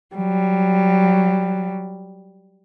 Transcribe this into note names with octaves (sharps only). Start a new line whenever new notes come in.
F#3 G3